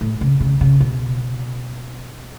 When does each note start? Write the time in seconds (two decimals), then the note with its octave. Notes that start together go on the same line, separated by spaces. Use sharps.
0.01 A2
0.21 C#3
0.40 C#3
0.61 C#3
0.81 B2